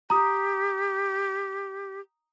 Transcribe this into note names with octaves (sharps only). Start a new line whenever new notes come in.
G4 A#5 D#6